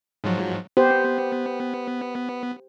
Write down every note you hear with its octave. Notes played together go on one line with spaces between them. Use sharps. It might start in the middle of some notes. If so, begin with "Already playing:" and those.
G#2 F3 F#3
B3 G4 C5